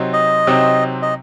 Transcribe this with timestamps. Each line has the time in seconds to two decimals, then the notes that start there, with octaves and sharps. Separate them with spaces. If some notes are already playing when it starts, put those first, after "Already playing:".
Already playing: C3 F#3 C4 D#4
0.13 D#5
0.47 C3 F#3 C4 D#4
1.02 D#5